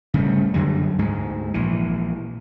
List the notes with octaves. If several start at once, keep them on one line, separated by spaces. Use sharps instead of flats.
C#3 G3 A3
F#2 D3 F#3 G3
D2 G#2 G#3
A#1 E3